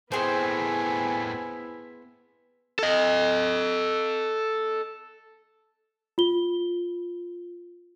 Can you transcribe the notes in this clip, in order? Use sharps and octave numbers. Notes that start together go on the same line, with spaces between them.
A2 B3 C4 E4 G#4 C5 G#5
A4 D#5
F4 G7